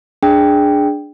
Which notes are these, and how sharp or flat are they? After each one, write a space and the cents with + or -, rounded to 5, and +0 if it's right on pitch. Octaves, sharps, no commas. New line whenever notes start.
D4 +0 G#4 +0 G5 +0